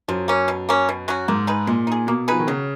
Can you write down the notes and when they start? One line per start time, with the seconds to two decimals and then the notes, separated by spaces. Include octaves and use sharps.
0.08 F#2 F3
0.28 A#3 C#4
0.48 B2
0.69 A#3 C#4
0.89 B2
1.08 F#3 C#4 F#4
1.28 G#2 A#3
1.47 D#4 G#4 B4
1.67 A#2 G#3
1.87 D#4 G#4
2.07 B2 A#3
2.28 F3 D#4 G#4 B4
2.40 D#3
2.47 C#3 F#3